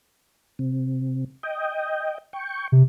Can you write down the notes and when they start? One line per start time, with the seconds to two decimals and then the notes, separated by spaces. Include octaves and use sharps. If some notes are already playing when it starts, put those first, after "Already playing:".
0.59 C3
1.43 D#5 G5
2.33 G5 C#6
2.72 C3